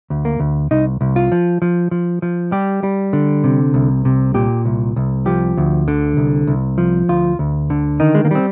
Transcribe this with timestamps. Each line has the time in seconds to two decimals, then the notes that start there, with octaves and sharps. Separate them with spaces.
0.10 D2
0.25 A#3
0.39 D2
0.71 C2 D#4
1.01 C2
1.16 F4
1.32 F3
1.62 F3
1.91 F3
2.22 F3
2.52 G3 G4
2.83 G3
3.13 D3
3.44 C3
3.74 C2
4.05 C3
4.35 A#2 G4
4.65 C2
4.96 C2
5.26 F3 G4
5.57 D2
5.88 D3
6.17 C2
6.47 C2
6.78 F3
7.09 D2 F4
7.39 D2
7.70 D3
8.00 D#3 D#4
8.15 G#3
8.25 A#3
8.31 G3 C4